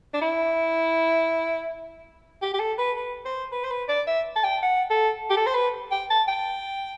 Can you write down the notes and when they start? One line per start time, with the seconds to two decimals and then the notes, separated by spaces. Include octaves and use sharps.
0.14 D4
0.21 E4
2.42 G4
2.54 G4
2.60 A4
2.78 B4
2.97 B4
3.25 C5
3.52 B4
3.64 C5
3.71 B4
3.89 D5
4.07 E5
4.36 A5
4.44 G5
4.63 F#5
4.90 A4
5.30 G4
5.37 A4
5.47 C5
5.55 B4
5.92 G5
6.10 A5
6.28 G5